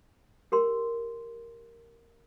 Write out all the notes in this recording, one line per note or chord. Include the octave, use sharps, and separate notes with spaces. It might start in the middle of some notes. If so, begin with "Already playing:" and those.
G4 A#4 C6